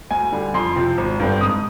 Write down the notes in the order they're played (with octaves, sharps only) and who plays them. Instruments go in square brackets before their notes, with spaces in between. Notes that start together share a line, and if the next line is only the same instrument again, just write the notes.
[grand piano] D2 G#5
D3 G3
F2 C6
C3 F3 C4
G#1
G2 D3 G3 C4
G#2 D#6